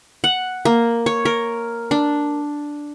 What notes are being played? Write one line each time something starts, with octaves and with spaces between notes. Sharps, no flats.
F#5
A#3
C#5
A#4
D4